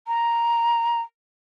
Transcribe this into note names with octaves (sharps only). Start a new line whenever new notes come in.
A#5